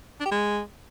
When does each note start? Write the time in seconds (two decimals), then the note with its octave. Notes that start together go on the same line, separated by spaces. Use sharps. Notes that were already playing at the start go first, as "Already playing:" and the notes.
0.20 D4
0.26 G4
0.31 G#3